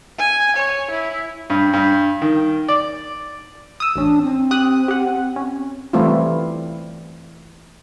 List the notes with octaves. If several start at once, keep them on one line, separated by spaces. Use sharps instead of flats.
G#5
C#5
E4
G2
G2
D#3
D5
D#6 E6
A1 C#4 D4
C4
G4 D#6 F#6
G4 F#5
C#4
E3 G3 A3 C4 E4 F4